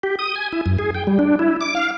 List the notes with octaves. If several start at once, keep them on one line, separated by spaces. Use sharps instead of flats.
G4
D#6
G#5
E4
F#2
G#4
G5
G3
D4
E4
D6
F5